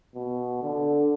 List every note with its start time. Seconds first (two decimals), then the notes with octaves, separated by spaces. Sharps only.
0.15 B2
0.62 D3